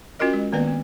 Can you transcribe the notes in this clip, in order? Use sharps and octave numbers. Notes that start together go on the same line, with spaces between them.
C#4 F4 F#4 A#4 D#5
G#3
D#3 A#3 B3 B4 D5
C4